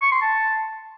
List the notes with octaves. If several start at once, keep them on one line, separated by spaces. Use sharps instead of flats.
C#6
C6
A5